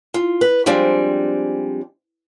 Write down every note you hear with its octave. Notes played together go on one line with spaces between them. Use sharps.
F4
B4
F3 G3 G#3 C4 D4